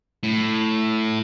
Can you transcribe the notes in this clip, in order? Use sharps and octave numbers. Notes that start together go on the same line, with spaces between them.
A2